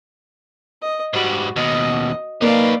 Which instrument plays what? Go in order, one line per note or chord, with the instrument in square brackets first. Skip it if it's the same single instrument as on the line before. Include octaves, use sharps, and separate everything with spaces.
[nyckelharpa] D#5
[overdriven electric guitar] G#2 G3 [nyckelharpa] F#4
[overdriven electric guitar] D#2 B2 [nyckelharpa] D#5
[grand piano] A#3 [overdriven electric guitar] D#4 B4 [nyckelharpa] D5 F5